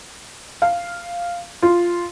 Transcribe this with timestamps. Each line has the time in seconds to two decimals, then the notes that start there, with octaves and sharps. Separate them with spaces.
0.62 F5
1.62 F4